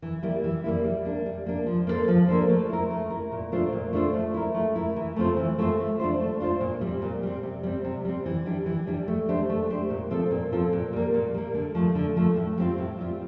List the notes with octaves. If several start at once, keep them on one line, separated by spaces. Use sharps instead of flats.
E3
G3 A#3 E4
E3
G3 A#3 E4
G3
A#3 D4
G3
A#3 D4
F3
A#3 D4 A4 C5
F3
A#3 D4 A4 C5
A3
E4 A#4
A3
E4 A#4
A#2
A3 D4 F4 C5
A#2
A3 D4 F4 C5
A3
E4 A#4
A3
E4 A#4
E3
A3 C4 F4 C5
E3
A3 C4 F4 C5
A3
D4 F4 C5
A3
D4 F4 C5
A#2
G3 C4
A#2
G3 C4
C3
G3 C4
C3
G3 C4
E3
G3 D4 G4
E3
G3 D4 G4
A3
D4 G4 C5
A3
D4 G4 C5
A#2
F3 C4 F4 A4
A#2
F3 C4 F4 A4
A#2
G3 A#3
A#2
G3 A#3
D3
F3 A3
D3
F3 A3
A2
G3 C4 F4
A2
G3 C4 F4